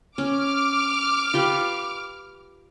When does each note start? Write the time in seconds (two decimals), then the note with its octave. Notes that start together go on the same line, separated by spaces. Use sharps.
0.18 C#4 D6 F6
1.34 F4 G4 B4